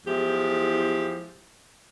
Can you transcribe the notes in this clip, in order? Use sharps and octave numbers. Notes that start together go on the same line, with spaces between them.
E2 F3 G#3 E4 G4